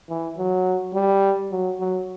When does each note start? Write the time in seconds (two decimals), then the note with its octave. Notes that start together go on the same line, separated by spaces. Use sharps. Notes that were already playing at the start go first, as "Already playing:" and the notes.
0.09 E3
0.38 F#3
0.94 G3
1.51 F#3
1.80 F#3